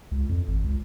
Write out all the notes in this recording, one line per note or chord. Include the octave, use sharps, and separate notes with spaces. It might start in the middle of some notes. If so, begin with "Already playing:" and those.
C#2
F2
G#1
C#2